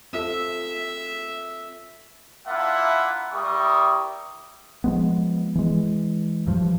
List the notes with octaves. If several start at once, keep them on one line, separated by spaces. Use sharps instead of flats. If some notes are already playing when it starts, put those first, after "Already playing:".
C4 F4 A4 E5
A#3 D4 E4 F4 E5 F#5
G3 E4 A#4 C#6 D#6
F3 G#3 B3
E3 G#3
G2 F3